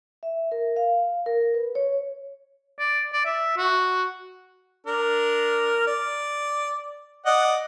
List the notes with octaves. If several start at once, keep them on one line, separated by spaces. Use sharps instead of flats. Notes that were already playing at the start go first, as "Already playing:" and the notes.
E5
A#4
F5
A#4
B4
C#5
D5
D5
E5
F#4
D4 A#4
D5
D5 D#5 F#5